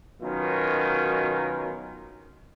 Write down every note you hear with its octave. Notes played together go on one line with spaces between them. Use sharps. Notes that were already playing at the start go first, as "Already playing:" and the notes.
B2 D#3 F#3 C#4 F4 A#4